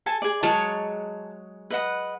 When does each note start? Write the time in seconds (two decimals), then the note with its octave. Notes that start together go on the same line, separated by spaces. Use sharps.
0.06 A4 G#5 A5
0.22 G#4 D5
0.43 F#3 G#3 C#5 A5
1.70 B4 D#5 F#5